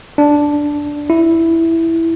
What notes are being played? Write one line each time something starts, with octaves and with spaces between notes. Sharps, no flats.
D4
E4